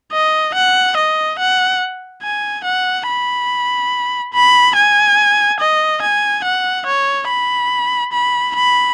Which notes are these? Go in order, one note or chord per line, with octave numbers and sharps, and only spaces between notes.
D#5
F#5
D#5
F#5
G#5
F#5
B5
B5
G#5
D#5
G#5
F#5
C#5
B5
B5
B5